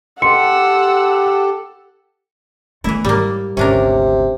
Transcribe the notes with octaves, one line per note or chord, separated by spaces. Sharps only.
G4 A4 F#5 C6 E6 C#7
E3 A3 B3 E4
G#2 G3 A#3
G#1 D2 C3 C#4 D4 A#4